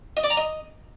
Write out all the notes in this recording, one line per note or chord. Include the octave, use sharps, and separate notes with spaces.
D#5
D5
A#5
D#5